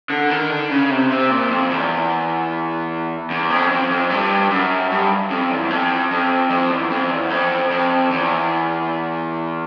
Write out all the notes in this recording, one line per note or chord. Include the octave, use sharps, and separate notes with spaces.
D3
D#3
D3
C#3
C3
C3
A#2
F2
E2
E2
F2
F2
F2
G2
F#2
G2
F2
E2
F2
F2
F2
E2
F2
E2
F2
F2
E2